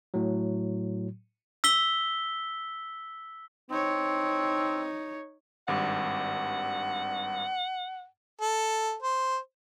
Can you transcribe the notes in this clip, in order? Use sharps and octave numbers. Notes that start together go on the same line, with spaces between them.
A2 F#3
E6 B6 G7
C4 D#4 C#5
G#1 G2 F#5 D6
A4
C5